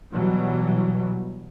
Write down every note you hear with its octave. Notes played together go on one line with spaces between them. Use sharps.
B2 E3 F#3 G3